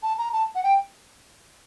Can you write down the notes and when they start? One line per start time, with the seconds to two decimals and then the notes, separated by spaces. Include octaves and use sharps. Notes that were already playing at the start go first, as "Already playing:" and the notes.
0.03 A5
0.18 A#5
0.33 A5
0.55 F#5
0.63 G5